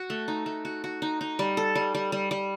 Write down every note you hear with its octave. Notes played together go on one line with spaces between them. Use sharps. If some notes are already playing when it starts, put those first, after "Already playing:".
Already playing: F#4
A3
D#4
A3
F#4
F#4
D#4
D#4
G3
A4
G3
G3
G3
G3